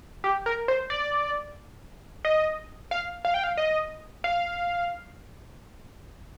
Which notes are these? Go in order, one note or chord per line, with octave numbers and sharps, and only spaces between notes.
G4
A#4
C5
D5
D#5
F5
F5
G5
F5
D#5
F5